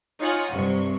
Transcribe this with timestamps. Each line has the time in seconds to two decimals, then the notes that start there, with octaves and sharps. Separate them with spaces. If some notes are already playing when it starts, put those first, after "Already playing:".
0.20 D#4 F4 C#5 F#5 G#5
0.51 G2 C3 C#6